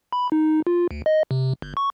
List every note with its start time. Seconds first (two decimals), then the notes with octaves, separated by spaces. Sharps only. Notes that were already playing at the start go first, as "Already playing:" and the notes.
0.13 B5
0.32 D#4
0.67 F4
0.91 D2
1.06 D#5
1.31 C3
1.62 G1
1.77 C#6